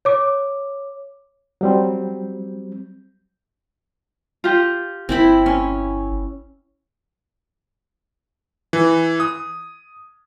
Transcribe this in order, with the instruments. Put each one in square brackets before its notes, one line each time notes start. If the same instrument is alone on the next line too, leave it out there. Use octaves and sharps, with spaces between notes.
[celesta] C#5 D6
[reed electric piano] F#3 G3 C4
[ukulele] F4 G4
[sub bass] G1 [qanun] C4 E4 B5
[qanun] C#4
[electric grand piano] E3
D#6